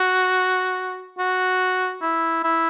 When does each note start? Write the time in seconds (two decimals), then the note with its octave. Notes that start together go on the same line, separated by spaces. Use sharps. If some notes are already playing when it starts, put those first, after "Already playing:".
Already playing: F#4
1.19 F#4
2.02 E4
2.44 E4